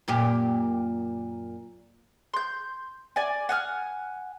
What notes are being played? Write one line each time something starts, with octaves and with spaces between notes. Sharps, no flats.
F#2 A#2 G4
C6 G6
D5 G#5
F#5 G#5 F6